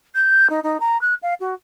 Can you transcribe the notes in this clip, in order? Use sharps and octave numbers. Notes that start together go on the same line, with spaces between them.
G6
D#4
D#4
A#5
F#6
F5
F#4